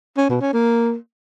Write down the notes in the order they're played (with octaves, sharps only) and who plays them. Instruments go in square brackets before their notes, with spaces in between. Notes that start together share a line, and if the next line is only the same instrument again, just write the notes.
[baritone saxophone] C#4
B2
C#4
A#3